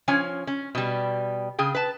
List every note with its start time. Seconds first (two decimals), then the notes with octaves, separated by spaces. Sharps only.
0.08 F3 C#4 C#5 G#5
0.47 C#4
0.75 B2 G3
1.59 C#3 G#4 G5
1.75 B4 A5